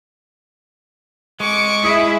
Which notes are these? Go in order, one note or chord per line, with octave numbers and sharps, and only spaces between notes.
G#3 C#6 D6
E4 G#4 E5 D#6